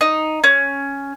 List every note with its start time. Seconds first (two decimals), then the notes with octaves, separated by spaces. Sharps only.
0.01 D#4
0.44 C#4